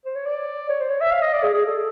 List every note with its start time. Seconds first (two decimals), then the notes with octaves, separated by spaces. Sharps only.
0.05 C5
0.15 C#5
0.26 D5
0.69 C#5
0.80 C5
0.90 C#5
1.01 E5
1.11 F5
1.22 D#5
1.33 D5
1.44 G#4
1.54 G#4
1.65 A4